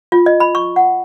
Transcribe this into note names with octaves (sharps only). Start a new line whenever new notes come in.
F4
D#5
B5
C#6
F#5